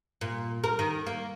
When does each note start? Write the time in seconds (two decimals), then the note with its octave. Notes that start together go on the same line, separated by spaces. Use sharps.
0.21 A#2
0.64 A#4
0.79 D#3
1.07 A#3